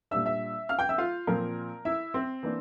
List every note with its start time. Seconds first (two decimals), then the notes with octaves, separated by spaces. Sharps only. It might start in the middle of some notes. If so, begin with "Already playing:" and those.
0.11 A#2 G3 D4 E5 E6
0.26 E5 E6
0.69 F5 F6
0.79 G5 G6
0.89 E5 E6
0.98 F4 F5
1.27 A#2 F3 C4 A#4
1.85 E4 E5
2.14 C4 C5
2.43 E3 A#3 D4